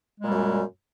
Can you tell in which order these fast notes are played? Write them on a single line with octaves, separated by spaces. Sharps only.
G#3 A#2 G3 F#2